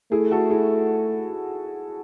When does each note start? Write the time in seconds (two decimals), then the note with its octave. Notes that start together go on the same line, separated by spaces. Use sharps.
0.12 A3 E4 G#4
0.31 F#4 A4
0.50 E4 G#4